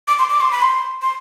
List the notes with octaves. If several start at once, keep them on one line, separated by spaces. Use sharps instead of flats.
D6
C6
D6
C6
B5
C6
C6